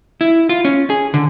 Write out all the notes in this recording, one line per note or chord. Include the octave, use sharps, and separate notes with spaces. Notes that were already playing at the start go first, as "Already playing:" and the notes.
E4
F4
C#4
G#4
D3